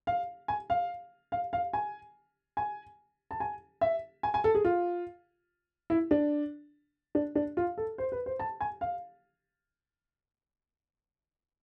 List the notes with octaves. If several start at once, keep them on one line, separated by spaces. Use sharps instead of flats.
F5
G#5
F5
F5
F5
G#5
G#5
A5
G#5
E5
G#5
G#5
A4
G#4
F4
E4
D4
D4
D4
F4
A4
C5
B4
C5
A5
G#5
F5